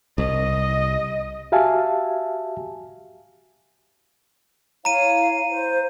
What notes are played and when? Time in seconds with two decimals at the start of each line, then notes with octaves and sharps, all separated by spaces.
0.18 C2 D#5
1.52 F#4 G4 E5 F5 G#5 A5
4.85 E4 C#5 F5 A#5 D#7
5.50 C5